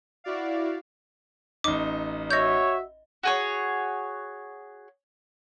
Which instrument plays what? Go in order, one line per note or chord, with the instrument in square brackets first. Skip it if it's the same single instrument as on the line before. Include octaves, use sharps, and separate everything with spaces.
[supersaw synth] E4 F#4 D5 F5
[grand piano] A1 D#4 [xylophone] D6
[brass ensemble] F#4 E5 [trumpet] C#5 [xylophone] D#5 G6
[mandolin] F#4 G#4 C#5